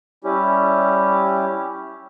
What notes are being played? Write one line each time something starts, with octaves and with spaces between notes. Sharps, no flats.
G3 C#4 E4 G4